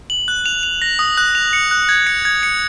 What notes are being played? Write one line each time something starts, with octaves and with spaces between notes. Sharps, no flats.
F#7
F#6
F7
F7
A#6
D#6
F#6
F7
C#7
F#6
G#6
C#7
G#6
C#7